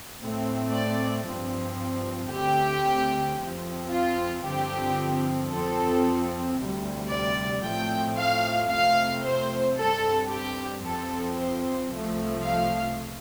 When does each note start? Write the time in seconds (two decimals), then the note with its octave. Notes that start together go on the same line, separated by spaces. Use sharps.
0.18 A2 A3 C4
0.71 D5
1.25 G2 F3 C4
2.30 D2 D3 A3 C4 G4
3.38 F2 F3 C4
3.90 F4
4.44 G2 D3 F3 C4 G4
5.50 F2 F3 C4 A4
6.57 D2 C3 G3
7.10 D5
7.64 A2 F3 A3 C4 G5
8.17 F5
8.70 F2 C3 A3 C4 F5
9.24 C5
9.77 G2 G3 C4 A4
10.30 G4
10.83 F2 F3 C4 A4
11.36 C5
11.90 C2 C3 F3 A3
12.43 F5